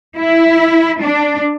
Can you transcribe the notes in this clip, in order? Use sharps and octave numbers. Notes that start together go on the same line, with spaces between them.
E4
D4